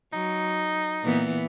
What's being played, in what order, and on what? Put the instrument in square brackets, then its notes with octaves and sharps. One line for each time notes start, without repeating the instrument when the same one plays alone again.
[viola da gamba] F#3 [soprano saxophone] D#4
[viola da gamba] A#2 E3 B3